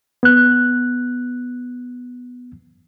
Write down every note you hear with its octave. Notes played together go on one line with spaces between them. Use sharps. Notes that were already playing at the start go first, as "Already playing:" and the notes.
B3 F#6